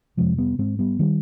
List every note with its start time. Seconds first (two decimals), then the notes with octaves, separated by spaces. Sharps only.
0.17 F2 C3 F3 G#3
0.38 G3 B3
0.58 G#2 G#3 C4
0.79 G3 B3
0.99 D#3 G3